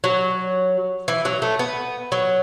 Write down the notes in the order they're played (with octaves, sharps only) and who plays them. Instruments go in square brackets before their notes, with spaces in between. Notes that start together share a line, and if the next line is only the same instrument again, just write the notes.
[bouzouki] F#3
E3
F#3
A3
B3
F#3